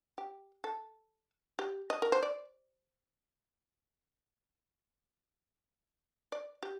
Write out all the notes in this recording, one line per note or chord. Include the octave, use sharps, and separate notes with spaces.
G4
A4
G4
D#5
A#4
C5
D5
D5
G4